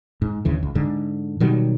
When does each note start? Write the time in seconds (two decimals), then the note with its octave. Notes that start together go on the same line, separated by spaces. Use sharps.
0.22 G#2
0.45 D2 C#3 E3
0.63 C#2
0.75 G#2 D3
1.40 B2 D#3 F#3 G3